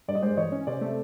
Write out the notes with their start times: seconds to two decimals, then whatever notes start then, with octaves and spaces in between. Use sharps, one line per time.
0.08 G2 D5
0.15 D#5
0.22 G#3 C5 D5
0.37 E3 C#5 D#5
0.52 C#4
0.67 C3 C5 D5
0.81 A3